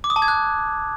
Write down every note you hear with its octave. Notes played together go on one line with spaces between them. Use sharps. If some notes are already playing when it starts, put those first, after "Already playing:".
D6
D#6
A5
G#6
F#6